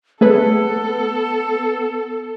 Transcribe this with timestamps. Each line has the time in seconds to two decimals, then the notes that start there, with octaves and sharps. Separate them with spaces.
0.21 A3 B3 G#4 A4 B4